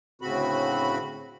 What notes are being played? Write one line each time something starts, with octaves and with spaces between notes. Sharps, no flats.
D2 A2 C#3 C4 F#4 B5